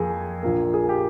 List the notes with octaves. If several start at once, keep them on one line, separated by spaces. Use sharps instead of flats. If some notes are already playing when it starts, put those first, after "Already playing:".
Already playing: F2 A#3 G#4
A#1 A#2 F3 A#3
G#4
G4